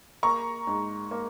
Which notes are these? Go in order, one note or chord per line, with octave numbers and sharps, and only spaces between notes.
A#3 A#5 C#6
G#2
A#3